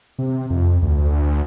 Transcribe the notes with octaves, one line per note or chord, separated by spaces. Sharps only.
C3
F2
D2